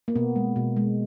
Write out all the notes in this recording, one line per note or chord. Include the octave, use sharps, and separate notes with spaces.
A#3
B2 B3
G#3
B2
G#3